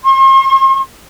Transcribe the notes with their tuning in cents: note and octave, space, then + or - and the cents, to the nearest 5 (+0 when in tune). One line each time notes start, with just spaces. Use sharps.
C6 +45